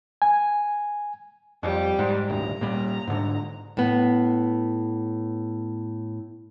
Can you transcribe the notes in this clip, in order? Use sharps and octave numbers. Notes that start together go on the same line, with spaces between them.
G#5
F2 G3
G#2
D#1 G#1 D2 A#5
A#2 G3
G#2 D3
A2 B3